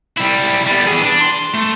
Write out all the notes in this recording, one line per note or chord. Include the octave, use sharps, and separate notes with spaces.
G3 E4
G3 B3
E3 G#4
D4
C6
A3